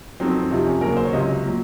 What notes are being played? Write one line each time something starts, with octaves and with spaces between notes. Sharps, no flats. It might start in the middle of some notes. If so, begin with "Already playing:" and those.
F2 D#3 F#3 C4
C4
F2 C3 F3 D#4
C#4
D#2 C#3 F#3 A#4
C5
C#5
C#2 C3 F#3 D#5
A#2 F#3